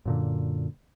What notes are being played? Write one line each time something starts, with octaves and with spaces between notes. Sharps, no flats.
F#2 A#2 D3